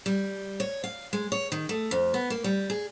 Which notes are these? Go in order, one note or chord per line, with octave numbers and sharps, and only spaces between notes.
G3
C#5
F5
G#3
C#5
D#3
A3
F2
B3
A#3
G3
G#4